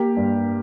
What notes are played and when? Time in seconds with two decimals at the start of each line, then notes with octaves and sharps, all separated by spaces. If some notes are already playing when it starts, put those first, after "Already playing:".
Already playing: A#3 G4
0.17 G2